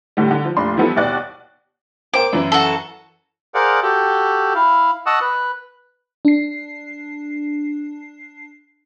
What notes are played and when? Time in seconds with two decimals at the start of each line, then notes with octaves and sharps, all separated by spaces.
0.17 A2 D3 G3
0.31 D3
0.45 F3
0.57 F1 A#2 D4 C6
0.77 E3 F3 G3 B3 E4 A4
0.96 D#2 B2 D5 F#6
2.14 A#4 C5 G5 D6
2.33 F#2 E3 E4
2.52 F#4 A4
3.55 G#4 A#4 C5 D5 F5 F#5
3.83 F#4 G4 A4 G5
4.55 E4 F5
5.06 D#5 F#5 A5 C#6 D#6 E6
5.21 B4
6.25 D4 C7